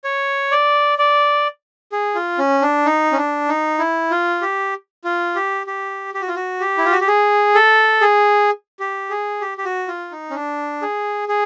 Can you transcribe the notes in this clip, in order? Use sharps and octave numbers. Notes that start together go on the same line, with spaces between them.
C#5
D5
D5
G#4
F4
C#4
D4
D#4
C#4
D4
D#4
E4
F4
G4
F4
G4
G4
G4
F#4
F4
F#4
G4
E4
F4
F#4
G4
G#4
A4
G#4
G4
G#4
G4
G4
F#4
F4
D#4
C#4
D4
G#4
G#4